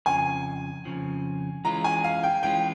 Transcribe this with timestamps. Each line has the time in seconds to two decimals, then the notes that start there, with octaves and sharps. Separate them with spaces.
0.06 F2 C#3 F3 G#5
0.85 F2 C#3 F3
1.65 E3 G#3 C#4 F4 A#5
1.84 G#5
2.04 F5
2.23 G5
2.43 E3 G#3 C#4 F4 G5